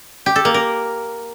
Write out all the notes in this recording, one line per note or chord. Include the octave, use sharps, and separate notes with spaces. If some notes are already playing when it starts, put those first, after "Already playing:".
G4
A4
A#3
A#4